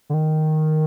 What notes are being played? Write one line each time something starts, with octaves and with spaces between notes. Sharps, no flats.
D3
D#3